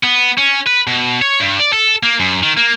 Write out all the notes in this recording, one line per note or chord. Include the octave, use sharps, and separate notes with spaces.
B3
C#4
B4
B2
C#5
G2
D5
A4
A#3
F#2
D#3
A#3